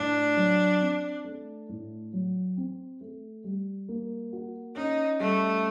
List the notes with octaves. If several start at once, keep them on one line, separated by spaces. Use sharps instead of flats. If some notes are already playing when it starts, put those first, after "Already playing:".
Already playing: A2 D4
F#3
C4
A3
A2
F#3
C4
A3
G3
A#3
F#4
C#4 D#4
G3 A3